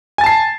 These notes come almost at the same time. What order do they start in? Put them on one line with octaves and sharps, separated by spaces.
G#5 A6 A5 C7